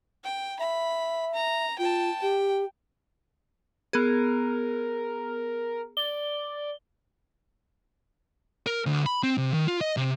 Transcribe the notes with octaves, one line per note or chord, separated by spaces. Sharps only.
G5
E5 B5
A#5
F4 G5 A5
G4 G5
B3 G#4 A#4
D5 G7
A#4
D2
B5
C4
C3
D#3
F4
D#5
C3